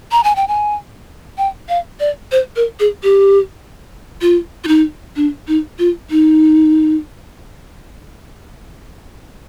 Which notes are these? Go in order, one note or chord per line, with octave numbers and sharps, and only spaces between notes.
A#5
G#5
G5
G#5
G5
F5
D5
C5
A#4
G#4
G4
F4
F4
D#4
D4
D#4
F4
D#4